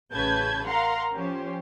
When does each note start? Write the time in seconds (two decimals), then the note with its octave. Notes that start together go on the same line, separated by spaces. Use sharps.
0.12 A1 C#3 B4 A5 G6 G#6
0.67 A#4 F5 F#5 A#5 C6
1.13 F3 C#4 G4 C5